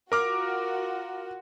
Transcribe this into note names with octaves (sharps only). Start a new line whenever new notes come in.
F4 F#4 A#4 D6 F6